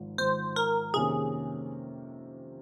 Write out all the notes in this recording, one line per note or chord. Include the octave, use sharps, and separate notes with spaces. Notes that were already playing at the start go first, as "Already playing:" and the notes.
Already playing: G#1 G#2 F3
G#1 G#2 F3 C5
A#4
F2 C3 D#3 A#3 C#4 G#4